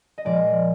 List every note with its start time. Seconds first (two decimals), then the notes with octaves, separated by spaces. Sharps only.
0.18 D#5
0.25 A#2 F3 G#3 D5